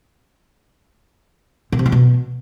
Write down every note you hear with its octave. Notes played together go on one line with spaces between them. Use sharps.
A#2
C3
E3
B2